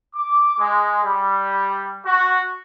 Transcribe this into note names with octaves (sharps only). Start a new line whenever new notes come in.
D6
G#3
G3
F#4